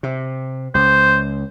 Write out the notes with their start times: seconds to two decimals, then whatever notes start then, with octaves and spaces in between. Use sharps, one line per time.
0.03 C3
0.75 C#2 C5